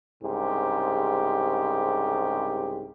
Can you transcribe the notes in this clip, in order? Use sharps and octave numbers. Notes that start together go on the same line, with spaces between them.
C2 G#2 C#3 G4